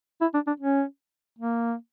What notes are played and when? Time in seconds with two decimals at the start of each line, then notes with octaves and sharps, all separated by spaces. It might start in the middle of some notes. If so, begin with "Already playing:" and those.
0.21 E4
0.34 D4
0.47 D4
0.60 C#4
1.39 A#3